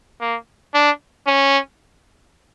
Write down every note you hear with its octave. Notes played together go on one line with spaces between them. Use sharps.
A#3
D4
C#4